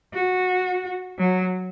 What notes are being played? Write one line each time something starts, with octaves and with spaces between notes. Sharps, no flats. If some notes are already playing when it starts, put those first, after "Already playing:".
F#4
F#3